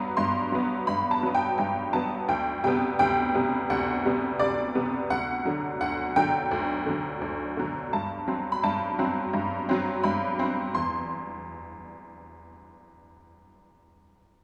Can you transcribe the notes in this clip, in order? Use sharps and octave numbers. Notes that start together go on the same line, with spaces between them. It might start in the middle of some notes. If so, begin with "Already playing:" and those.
Already playing: G2 F#3 B3
G2 C6
F#3 B3
G2 B5
A5
F#3 B3
G5
G2 G5
F#3 B3 A5
D2 G5
C3 G3 B3 G5
D2 G5
C3 G3 B3
D2 F#5
C3 G3 B3
D2 D5
C3 G3 B3
D2 F#5
D3 F#3
D2 F#5
D3 F#3 G5
D2
D3 F#3
D2
D3 F#3
G2 A5
F#3 C4
B5
G2 A5
F#3 C4
G2
F#3 C4
G2 B5
F#3 C4
E2 C6